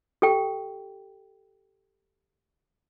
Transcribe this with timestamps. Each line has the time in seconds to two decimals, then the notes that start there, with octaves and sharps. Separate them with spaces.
0.22 G4 A4 G5